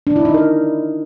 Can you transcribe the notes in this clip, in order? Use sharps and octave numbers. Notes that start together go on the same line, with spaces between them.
D4
E4
D#4
A#4